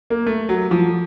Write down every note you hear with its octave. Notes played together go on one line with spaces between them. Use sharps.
A#3
A3
F#3
F3